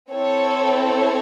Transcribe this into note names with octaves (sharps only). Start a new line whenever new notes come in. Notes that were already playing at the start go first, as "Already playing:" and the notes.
C4 E4 A4 C#5
C#5